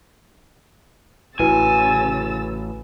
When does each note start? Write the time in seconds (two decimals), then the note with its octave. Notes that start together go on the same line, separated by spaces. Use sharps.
1.39 A1 C#3 E4 F#4 B4 G#5 E6 A6